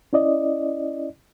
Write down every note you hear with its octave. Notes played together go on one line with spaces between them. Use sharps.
C#4 E4 D5 D#5